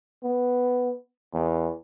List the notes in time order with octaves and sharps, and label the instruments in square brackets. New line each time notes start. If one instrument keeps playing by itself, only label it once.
[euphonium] B3
E2